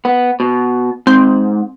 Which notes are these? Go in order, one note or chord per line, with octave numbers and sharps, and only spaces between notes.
B3
B2
G#2 C4